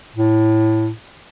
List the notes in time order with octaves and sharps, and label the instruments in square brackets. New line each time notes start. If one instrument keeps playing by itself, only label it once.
[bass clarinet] A2